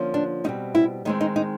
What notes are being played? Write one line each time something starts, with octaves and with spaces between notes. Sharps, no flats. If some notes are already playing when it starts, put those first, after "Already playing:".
Already playing: D3 F3 A#3 C#4
D4
B2 G3 C4 D#4
E4
D#3 G#3 C4 D#4
D#4
D#4